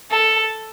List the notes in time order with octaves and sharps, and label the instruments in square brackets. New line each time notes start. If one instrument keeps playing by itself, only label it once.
[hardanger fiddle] A4